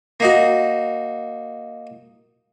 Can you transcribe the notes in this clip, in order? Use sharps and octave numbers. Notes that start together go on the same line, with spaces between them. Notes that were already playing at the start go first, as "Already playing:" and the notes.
A#3 D#4 F#4